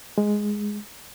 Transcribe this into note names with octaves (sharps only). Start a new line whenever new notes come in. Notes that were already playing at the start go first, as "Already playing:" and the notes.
G#3